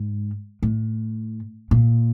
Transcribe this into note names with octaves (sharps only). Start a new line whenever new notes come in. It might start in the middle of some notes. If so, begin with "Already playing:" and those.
Already playing: G#2
A2
A#2